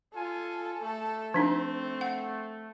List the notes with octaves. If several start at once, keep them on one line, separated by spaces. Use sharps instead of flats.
F4 A4 G#5
A3 A4
F3 C4 D4 D#4
F#5